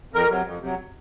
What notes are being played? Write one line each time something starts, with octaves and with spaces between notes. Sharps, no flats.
F2 A#4
C3 F#3
F2
C3 F#3